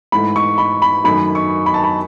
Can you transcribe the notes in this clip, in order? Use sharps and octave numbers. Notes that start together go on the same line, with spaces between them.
G#2 E3 A3 B5
C#6
B5
B5
F#2 D#3 A3 B5
C#6
B5
A5
B5